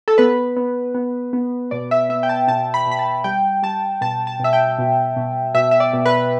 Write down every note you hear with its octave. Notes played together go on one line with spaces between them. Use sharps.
A4
B3 B4
B3
B3
B3
B2 D5
E5
B3 E5
G5
A5
B2 A5
B5
B2
B5
A5
G3 G5
G3 A5
B2 A5
A5
B2 E5
G5
B2
B2
B2 E5
E5
D5
B2
B4